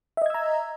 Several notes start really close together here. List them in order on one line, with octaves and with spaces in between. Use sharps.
E5 D#5 G#6 E6 A#5